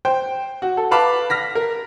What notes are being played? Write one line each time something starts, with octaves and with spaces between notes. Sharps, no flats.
C5 G5
F#4
A4
B4 F5 A5 B5 D6
F6 A#6 B6
A#4